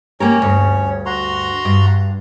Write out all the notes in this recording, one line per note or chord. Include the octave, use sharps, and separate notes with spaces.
A#3 C#4 G4 A#4 C#5
D2 G2
F#4 A#5 C6
G2